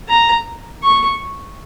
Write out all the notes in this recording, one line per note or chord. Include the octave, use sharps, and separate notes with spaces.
A#5
C#6